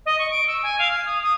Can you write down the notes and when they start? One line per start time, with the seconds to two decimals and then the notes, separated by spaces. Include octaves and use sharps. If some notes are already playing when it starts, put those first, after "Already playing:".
0.06 D#5
0.19 C#6
0.31 D7
0.47 E6
0.63 G#5
0.79 F5
0.93 G#6
1.05 D#6
1.22 D#6